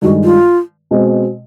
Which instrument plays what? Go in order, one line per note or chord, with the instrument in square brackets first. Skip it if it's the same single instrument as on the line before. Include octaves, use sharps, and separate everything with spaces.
[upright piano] G2 D#3 G#3 [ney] F#4
[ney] F4
[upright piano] B2 G#3 C4